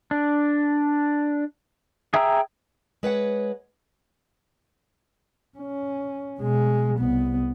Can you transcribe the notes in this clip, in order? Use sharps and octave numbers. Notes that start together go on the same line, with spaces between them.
D4
G#4 E5 G5 A#5 E6
G#3 B4 C#5 F#5
C#4
B2 G#3
C2 B3